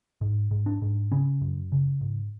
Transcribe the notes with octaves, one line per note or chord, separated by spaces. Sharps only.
G#2
G#2
D4
G#2
C#3 C#4
F#2
C#3
G#2